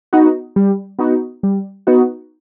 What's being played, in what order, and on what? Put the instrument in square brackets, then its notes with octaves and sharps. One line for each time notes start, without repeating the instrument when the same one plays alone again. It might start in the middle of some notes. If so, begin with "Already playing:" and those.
[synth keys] B3 D#4 F#4
G3
B3 D#4 F#4
G3
B3 D#4 F#4